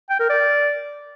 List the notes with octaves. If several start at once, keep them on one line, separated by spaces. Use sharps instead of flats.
G5
A#4
D5